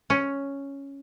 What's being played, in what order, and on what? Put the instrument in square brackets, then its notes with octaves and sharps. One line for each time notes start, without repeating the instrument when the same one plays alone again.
[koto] C#4